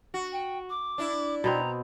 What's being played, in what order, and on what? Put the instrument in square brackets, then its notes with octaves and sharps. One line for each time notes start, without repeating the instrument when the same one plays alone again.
[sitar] F#4
[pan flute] G5
D6
[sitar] D4 E4
[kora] B2 B3 C4 [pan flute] A#5